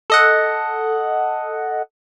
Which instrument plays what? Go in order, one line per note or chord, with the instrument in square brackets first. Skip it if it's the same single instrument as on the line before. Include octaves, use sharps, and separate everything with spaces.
[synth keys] A4 D#5 F#5